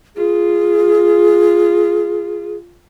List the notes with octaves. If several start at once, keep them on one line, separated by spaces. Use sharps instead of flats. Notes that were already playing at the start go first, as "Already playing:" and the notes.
F4 G#4